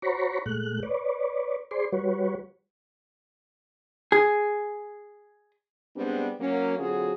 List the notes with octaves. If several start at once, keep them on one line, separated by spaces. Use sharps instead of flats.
F#4 C5 C#5 A#5 B5 C#6
A#2 G#3 A3 F#6
B4 C#5 D5
G#4 C5 D5 C6
G3 F#4 B4 C#5
G#4
G3 G#3 B3 C4 D4
F#3 A#3 C#4
D3 F#3 C4 F4 F#4 G#4